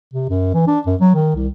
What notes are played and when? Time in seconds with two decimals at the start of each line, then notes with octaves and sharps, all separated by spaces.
0.13 C3
0.29 F#2
0.54 E3
0.67 D4
0.86 F#2
1.00 F#3
1.15 D#3
1.35 C2